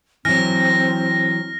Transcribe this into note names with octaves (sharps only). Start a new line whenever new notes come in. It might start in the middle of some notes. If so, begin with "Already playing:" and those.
E3 F#3 C4 F6 A#6